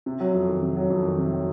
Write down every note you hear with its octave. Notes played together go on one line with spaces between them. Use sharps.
C3
F#3
F2
D#3
C3
F#3
F2
D#3
C3
F#3